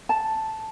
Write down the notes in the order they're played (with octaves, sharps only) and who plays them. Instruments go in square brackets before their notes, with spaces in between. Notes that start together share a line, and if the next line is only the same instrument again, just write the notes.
[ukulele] A5